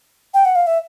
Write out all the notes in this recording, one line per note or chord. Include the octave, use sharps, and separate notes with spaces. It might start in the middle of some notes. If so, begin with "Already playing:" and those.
G5
F#5
F5
E5